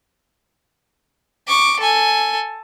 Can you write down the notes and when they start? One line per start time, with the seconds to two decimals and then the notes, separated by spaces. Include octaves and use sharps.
1.48 C#6 D6
1.80 A4 G#5